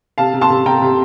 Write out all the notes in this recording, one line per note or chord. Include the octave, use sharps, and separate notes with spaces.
C3 F5 A5
C3
A5 C6
C3
C3 G5 A#5
C3